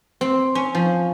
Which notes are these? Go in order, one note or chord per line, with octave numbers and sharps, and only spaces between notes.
C4
C#4
F3